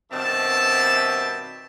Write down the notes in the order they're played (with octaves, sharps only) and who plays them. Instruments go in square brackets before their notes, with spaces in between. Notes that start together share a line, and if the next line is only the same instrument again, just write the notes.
[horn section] G2 B2 D#3 C4 E5 A5